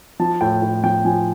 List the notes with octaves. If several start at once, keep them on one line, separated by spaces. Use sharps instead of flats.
F3 A5
A2 G5
A2
F3 G5
F3 G#5